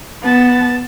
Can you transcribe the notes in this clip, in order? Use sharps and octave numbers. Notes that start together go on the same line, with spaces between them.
B3 A5